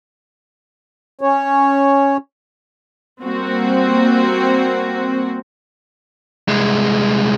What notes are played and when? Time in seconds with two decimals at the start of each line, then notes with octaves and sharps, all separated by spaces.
1.21 C#4 C#5
3.22 G3 A#3 C4 F#4
6.48 C2 G#3